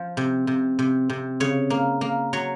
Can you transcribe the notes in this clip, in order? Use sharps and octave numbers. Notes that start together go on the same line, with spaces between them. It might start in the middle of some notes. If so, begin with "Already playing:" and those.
Already playing: F3
C3
C3
C3
C3
C#3 C#5
A#3
A#3
F#3 C#5